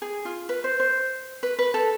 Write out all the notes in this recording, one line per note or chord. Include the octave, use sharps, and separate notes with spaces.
G#4
F4
B4
C5
C5
B4
B4
A4